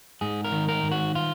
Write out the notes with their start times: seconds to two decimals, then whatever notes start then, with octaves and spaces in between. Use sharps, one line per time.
0.21 G#2 G#4
0.44 A#4
0.52 D#3
0.69 A#4
0.84 G#2
0.91 F#4
1.15 F4